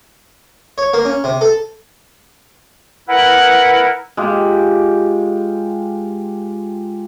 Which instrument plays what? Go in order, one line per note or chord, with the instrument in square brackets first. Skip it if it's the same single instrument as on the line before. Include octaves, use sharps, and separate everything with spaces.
[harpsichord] C#5
A#3
C#4
C3
A4
[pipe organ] E4 A#4 B4 [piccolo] F#5
[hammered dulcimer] G#3 F4 G4